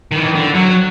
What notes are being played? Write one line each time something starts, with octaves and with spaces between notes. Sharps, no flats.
D#3 E3
D3
F#3